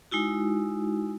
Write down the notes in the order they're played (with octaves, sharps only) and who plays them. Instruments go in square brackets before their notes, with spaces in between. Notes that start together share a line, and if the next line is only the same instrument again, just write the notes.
[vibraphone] G#3 D#4 E4 F#4